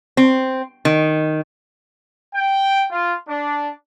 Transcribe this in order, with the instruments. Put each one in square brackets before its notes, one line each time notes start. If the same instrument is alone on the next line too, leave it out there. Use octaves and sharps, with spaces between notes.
[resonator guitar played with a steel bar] C4
D#3
[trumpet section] G5
F4
D4